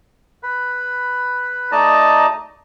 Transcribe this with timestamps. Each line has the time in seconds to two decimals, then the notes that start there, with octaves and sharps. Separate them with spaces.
0.43 B4 B5
1.72 A3 D#4 D5 D#5 A5 A#5